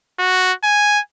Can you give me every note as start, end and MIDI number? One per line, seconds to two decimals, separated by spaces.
0.19 0.53 66
0.64 1.00 80